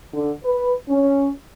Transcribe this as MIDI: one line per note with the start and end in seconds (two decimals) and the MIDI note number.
0.14 0.33 50
0.44 0.72 71
0.89 1.29 61